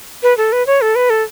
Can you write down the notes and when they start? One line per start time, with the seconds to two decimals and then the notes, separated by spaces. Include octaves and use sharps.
0.23 B4
0.37 A4
0.52 B4
0.67 C#5
0.81 A4
0.95 B4
1.10 A4